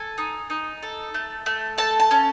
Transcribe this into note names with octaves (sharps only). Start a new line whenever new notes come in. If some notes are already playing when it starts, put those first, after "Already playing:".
Already playing: A4 G#5
D#4
D#4
A4
A3
A3
A4 A5
A5
C#4